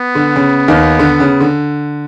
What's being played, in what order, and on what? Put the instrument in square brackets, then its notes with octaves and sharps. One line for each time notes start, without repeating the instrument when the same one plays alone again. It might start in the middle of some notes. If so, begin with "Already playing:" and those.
Already playing: [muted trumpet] B3
[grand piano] D3
C#3
D#2 D#3
D3
C#3
D3